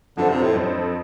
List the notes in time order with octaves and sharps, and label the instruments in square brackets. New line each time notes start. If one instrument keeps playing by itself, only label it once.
[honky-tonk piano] F2 F3 D4 A4 C5 [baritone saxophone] D3
[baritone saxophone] C3
A2
[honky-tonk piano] F2 F3 D4 A4 C5